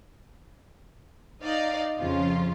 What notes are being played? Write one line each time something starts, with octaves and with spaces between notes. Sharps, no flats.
D#4 D5 D#5 F5
F2 C#3 F3 F4